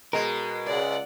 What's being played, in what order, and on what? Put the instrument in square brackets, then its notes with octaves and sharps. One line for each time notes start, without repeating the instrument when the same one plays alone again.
[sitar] B2 G#3 [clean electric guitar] A#4
[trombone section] C#2 [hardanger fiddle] D5 F#5